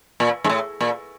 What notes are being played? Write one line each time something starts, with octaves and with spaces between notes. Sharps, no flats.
A#2
G#2
A2
A#2